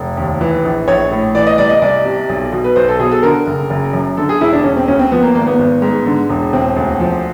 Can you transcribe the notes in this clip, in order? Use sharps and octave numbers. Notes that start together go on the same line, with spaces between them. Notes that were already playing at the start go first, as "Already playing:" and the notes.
Already playing: F1
D#2
E3
A#1
A#1 C#5
A2
E3 D5
D#5
C2 D5
D#5
C2 D5
C3
B1
B2
B4
B1 C5
A4
B2 G#4
A4
D3 A#4
F#1
F#1
F#2
D3 A4
G#4
E1 E4
D4
E1 C#4
C4
D2 C#4
C4
F3 B3
A#3
G#1 A#3
B3
G#1
G#2
D3
E1
E1 C4
D2
F3